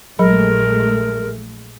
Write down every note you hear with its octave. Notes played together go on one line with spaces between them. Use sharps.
A#1 F#3 G#3 A3 G#4 A#4 B5